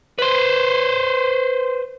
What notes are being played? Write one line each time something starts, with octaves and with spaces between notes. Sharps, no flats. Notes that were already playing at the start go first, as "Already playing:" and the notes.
B4 C5